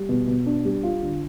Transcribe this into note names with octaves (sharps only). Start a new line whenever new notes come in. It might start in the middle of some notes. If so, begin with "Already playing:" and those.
Already playing: G3
B2
B2
D4
G3
F4
D3